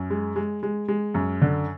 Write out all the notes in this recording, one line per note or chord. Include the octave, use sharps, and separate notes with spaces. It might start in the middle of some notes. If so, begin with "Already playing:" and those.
Already playing: F#2
G#3
G#3
G#3
G#3
F#2
D3